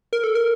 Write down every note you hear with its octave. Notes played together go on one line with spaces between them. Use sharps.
A#4
A4
A#4